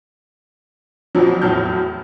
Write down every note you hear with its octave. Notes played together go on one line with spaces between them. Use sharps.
A#1 F2 F3 F#3
E2 A2 F#3 A5 F6 G6